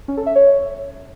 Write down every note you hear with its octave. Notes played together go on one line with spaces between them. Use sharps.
C#4
A4
E5
C#5